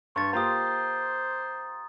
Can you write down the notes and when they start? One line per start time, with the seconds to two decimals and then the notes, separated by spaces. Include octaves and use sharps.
0.16 G2 C6 C#6 A6
0.33 A#3 F4 G4 C5 A#5 D#6